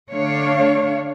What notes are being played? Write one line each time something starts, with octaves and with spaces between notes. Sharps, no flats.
D3 A3 D4 C#5 F5